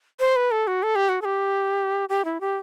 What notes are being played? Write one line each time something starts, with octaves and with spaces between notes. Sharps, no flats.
C5
B4
A4
F#4
A4
G4
F#4
A4
G4
G4
E4
G4